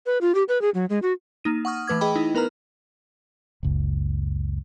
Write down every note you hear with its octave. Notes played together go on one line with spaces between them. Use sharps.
B4
F4
G4
B4
G#4
F#3
G#3
F#4
A#3 D#4 D#7
F#5 C#6 D#6 F6
E3 A3 B4 D6 G#6
G#4 D#5 G5 B5
D#4 E4
B3 A#4 B4 A#5 F6
F#1 C#2